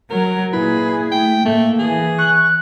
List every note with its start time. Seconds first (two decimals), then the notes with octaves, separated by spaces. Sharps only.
0.10 F#3 A#4
0.53 A#2 E4 G#4 B4
1.12 A3 G5
1.45 A2 A3 A#3
1.79 E3 G#4
2.18 C#6 F#6